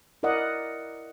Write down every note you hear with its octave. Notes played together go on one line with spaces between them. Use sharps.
E4 A#4 D5 D#5 F#5